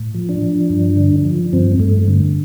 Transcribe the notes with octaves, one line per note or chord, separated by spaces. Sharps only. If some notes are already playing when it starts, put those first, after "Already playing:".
Already playing: A2
F3
D4
F3
G2
D3
F3
G2 C4
G2 A3
D3